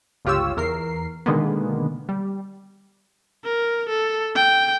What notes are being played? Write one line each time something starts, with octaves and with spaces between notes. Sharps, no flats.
G1 C#2 F4 G4 C#5 E6
E2 A#4 C7
B2 D3 D#3 G#3 A#3 B3
G3
A#4
A4
G5